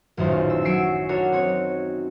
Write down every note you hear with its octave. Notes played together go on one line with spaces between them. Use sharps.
D#1 A1 F#2 D#4 F4 C5
E6
F#3 C#6 E6 C7 D7
D4 F#4 A#4 C#5
C4 D#4 C#5